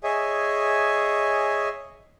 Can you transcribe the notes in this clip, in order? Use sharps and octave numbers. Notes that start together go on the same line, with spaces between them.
G#4 C#5 D#5 E5 G#5